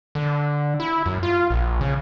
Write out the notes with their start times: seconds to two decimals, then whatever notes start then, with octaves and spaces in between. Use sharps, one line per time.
0.15 D3
0.80 E4
1.06 F#2
1.23 F4
1.51 A#1
1.81 C#3